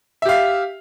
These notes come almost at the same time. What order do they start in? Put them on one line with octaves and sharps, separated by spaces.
E5 G4 F5